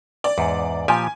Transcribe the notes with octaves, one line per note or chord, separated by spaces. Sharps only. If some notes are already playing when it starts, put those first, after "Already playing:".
D5
E2 G#2
A#2 F3 G4 G#5